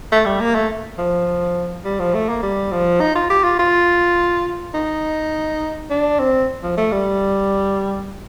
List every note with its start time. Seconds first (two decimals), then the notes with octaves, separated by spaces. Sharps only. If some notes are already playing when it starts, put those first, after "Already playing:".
0.12 A3
0.26 G3
0.41 A#3
0.55 A3
0.98 F3
1.85 G3
2.00 F3
2.14 A3
2.29 A#3
2.43 G3
2.72 F3
3.00 D#4
3.15 F4
3.30 G4
3.44 F4
3.59 F4
4.74 D#4
5.90 D4
6.19 C4
6.63 F3
6.77 A3
6.92 G3